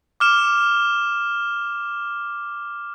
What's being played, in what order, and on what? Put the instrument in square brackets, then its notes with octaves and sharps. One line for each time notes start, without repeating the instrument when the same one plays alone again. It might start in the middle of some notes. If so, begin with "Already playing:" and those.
[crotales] D6 F6 E7